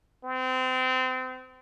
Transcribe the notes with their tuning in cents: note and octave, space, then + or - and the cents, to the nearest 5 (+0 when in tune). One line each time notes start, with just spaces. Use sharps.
C4 -30